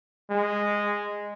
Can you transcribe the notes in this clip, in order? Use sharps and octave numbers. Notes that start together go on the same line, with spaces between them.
G#3